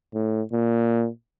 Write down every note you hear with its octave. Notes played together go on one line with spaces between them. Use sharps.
A2
A#2